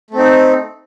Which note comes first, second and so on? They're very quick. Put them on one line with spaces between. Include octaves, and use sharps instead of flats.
A3 C4 D#4